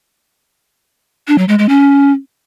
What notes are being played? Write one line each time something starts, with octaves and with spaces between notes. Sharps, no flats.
D4
F#3
G#3
G#3
C#4